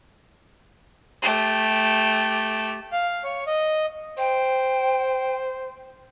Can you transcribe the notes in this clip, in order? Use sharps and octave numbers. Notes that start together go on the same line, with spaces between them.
A3 G4
F5
C#5
D#5
C5 G5